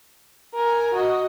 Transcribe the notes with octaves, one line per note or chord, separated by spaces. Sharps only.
A#4 G#5
F#4 D#5